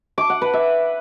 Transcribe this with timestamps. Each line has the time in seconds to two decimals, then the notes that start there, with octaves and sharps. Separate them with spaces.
0.18 D6
0.30 F#5
0.42 B4
0.54 E5